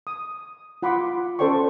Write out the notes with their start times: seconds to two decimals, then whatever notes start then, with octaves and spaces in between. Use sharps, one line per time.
0.07 D#6
0.83 F4 F#5 B5 C6 D6
1.39 C#4 A4 C5 D5 G5 C#6